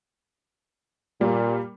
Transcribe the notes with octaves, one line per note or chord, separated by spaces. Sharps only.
A#2 G3 A#3